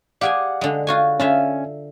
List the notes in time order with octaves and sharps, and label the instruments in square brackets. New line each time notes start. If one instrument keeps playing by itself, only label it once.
[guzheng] G4 G#4 G#5 [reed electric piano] D5 F5 F#5
[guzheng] D3 G#3
F4 F#4 G#5
[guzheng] D3 F4 E5 [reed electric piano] C#4 G#5